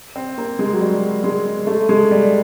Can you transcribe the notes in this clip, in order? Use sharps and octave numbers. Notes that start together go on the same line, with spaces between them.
C4
A#3
G#3
F#3
G3
G#3
A3
G#3
G3